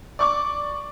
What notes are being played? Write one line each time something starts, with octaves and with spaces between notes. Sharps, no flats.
D5 C#6 D6